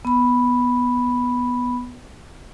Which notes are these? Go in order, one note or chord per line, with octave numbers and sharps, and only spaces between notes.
B3 B5